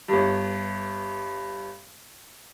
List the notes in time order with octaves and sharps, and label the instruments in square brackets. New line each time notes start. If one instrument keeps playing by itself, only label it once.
[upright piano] G1 G2